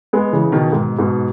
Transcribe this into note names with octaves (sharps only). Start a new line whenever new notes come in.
G#3 B3
C#3 E3
B2 D#3
G#2 B2
G#2 B2